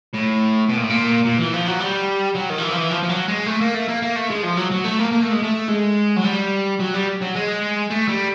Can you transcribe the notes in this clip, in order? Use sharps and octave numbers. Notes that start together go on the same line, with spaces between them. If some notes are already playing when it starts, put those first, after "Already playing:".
A2
B2
A#2
A2
A#2
A#2
E3
F3
F#3
G3
F#3
D#3
F3
E3
F3
E3
F3
F3
F#3
G#3
A3
A#3
A3
A#3
A#3
A3
G#3
F3
F#3
F#3
A3
A#3
A#3
A3
G#3
A3
G#3
F#3
G3
F#3
G3
F#3
G#3
A3
G3